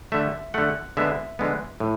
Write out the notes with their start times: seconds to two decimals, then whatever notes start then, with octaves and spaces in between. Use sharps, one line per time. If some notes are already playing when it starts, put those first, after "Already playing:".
0.12 D3 A3 E5
0.54 D3 A3 F#5
0.97 D3 G#3 B3 E5
1.39 D3 G#3 B3
1.80 A2